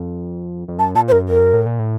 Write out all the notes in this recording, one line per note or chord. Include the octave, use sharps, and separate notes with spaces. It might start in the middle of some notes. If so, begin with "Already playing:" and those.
Already playing: F2
F2
F#2 A5
A#2 A5
C5
F#2 A#4
F2 A#4
F#2
A2
A#2
A2